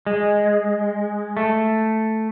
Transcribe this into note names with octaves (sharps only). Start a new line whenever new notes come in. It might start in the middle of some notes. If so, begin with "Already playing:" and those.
G#3
A3